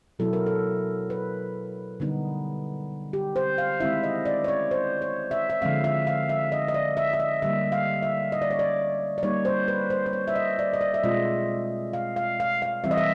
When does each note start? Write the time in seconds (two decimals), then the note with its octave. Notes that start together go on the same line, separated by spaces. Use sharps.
0.19 B2 F#3 B3 E4 A4
0.33 A#4
0.46 A4
1.10 B4
2.00 D3 G3 B3 D#4
3.13 G4
3.36 C5
3.58 F5
3.80 D#3 G#3 C4 E4 E5
4.03 D#5
4.25 D5
4.44 C#5
4.48 D5
4.71 C5
5.02 C#5
5.31 E5
5.50 E5
5.62 D3 F3 G#3 C4 F5
5.84 E5
6.07 F5
6.29 E5
6.52 D#5
6.68 D#5
6.74 D5
6.97 E5
7.13 E5
7.20 D#5
7.42 D3 G3 A#3 E5
7.72 F5
8.03 E5
8.32 D#5
8.42 D5
8.50 C#5
8.59 D5
9.18 D5
9.23 G3 A#3 D#4 C#5
9.45 C5
9.68 B4
9.90 C5
10.06 C5
10.13 C#5
10.28 E5
10.35 D#5
10.59 D5
10.73 D#5
10.81 D5
10.94 E5
11.03 B2 G#3 C4 F4 D#5
11.93 F5
12.16 F5
12.40 F5
12.62 F5
12.84 E3 G3 C4 E5
12.91 D#5
12.98 E5